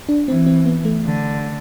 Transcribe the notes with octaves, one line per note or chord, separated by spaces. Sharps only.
D4
E3 C4
C4
B3
A3
D3